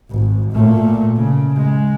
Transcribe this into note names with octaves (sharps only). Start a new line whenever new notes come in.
G#1
A#2 A3
C#3
G#3